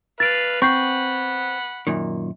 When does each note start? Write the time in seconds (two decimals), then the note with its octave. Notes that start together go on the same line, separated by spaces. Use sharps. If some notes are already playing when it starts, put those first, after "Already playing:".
0.20 B4 F5 A6 D7
0.62 C4 F#5 B5 C#6 G6 C7
1.87 F#2 A#2 D#3